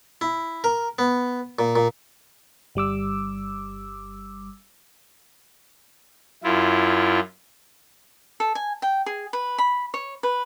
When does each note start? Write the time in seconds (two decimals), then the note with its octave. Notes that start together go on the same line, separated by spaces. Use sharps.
0.21 E4
0.64 A#4
0.99 B3
1.59 A#2
1.76 A#2
2.75 G1 G3 D6 E6
6.44 F#2 E4 F4
8.40 A4
8.55 G#5
8.82 G5
9.06 G#4
9.33 B4
9.58 B5
9.94 C#5
10.23 B4